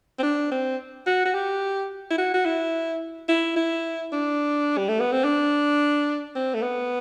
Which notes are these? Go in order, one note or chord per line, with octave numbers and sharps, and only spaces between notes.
C4
D4
C4
F#4
F#4
G4
E4
F#4
F#4
E4
E4
E4
D4
G3
A3
B3
C4
D4
C4
A3
B3